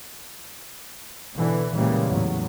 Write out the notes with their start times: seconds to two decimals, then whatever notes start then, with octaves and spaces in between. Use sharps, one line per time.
1.34 B2 D3 E3
1.74 A#2 C#3 E3 G3 G#3 A#3
2.08 E2 A2 F#3